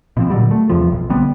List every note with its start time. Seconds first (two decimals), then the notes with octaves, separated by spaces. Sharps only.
0.17 B2 F3 C4
0.30 A#2 D3 F#3 G3
0.51 A3
0.70 E2 G2 C3 F3
0.92 B1
1.10 D3 G3 B3 C4